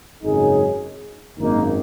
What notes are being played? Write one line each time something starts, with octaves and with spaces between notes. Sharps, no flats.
G#1 F#2 C#3 F#3 D#4 G#4
G#1 F#2 D#3 A#3 D#4